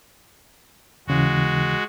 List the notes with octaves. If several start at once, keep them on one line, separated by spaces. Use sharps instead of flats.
D#2 C#3 E3 G#3 F#4